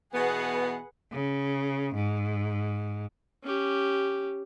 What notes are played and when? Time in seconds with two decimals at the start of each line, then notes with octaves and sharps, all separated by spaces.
0.14 B2 E3 B3 G#4 B4 F#5
1.13 C#3
1.95 G#2
3.44 C#4 G4